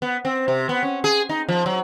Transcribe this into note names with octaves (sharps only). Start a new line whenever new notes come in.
B3
C4
C3
B3
C#4
G#4
D#4
F3
F#3